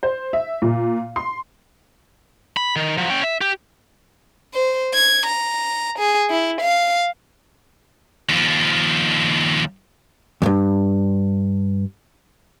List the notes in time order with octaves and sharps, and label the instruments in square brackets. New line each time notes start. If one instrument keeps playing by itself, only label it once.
[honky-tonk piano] C5
E5
A#2
C6
[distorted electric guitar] B5
D#3
F3 F#3
C#4 G5
E5
G4
[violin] C5
G#6
A#5
G#4
E4
F5
[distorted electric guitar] D#2 F3
[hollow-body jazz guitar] E2 G2